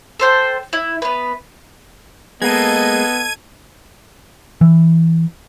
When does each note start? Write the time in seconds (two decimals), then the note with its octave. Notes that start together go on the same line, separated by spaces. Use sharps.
0.20 A4 C5 G5
0.73 E4
1.02 B3 B4
2.42 G#3 A#3 B3 A4 D#5 G#6 D#7
4.61 E3